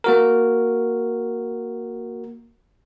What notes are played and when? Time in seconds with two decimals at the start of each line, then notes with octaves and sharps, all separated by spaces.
0.04 A#3 F#4 A#4